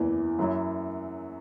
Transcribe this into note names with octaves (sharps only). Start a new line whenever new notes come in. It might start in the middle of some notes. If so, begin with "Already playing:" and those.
Already playing: F#1 E2 E3
F#2 F#3 E4